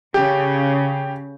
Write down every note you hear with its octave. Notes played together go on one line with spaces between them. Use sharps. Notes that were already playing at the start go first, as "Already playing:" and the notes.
C#3 G4